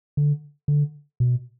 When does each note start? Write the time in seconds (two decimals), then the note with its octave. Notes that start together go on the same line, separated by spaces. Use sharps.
0.17 D3
0.68 D3
1.20 B2